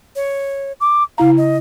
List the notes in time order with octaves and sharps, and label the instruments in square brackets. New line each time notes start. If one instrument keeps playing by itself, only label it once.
[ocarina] C#5
D6
[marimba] C#3 E4 A#5 [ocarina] F5
[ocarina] D#5